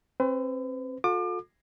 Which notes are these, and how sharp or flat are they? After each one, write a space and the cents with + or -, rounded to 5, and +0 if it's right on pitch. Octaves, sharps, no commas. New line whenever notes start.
C4 +25 B4 +45
F4 +45 A4 +0 D6 +35